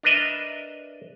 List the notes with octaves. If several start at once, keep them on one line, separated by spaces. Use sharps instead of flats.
D4 A#4 B4 D#5 E5